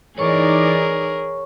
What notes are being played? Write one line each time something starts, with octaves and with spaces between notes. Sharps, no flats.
E3 D#4 G#4 A#4 C#5 D5 C#6